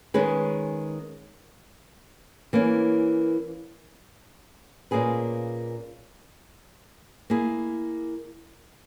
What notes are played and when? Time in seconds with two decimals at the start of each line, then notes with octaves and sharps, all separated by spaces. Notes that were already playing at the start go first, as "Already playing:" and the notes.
0.14 D#3 G#3 C#4 G#4 B4
2.53 E3 A#3 C#4
4.91 A#2 A#3 C#4 G#4 B4
7.30 A#3 E4 G#4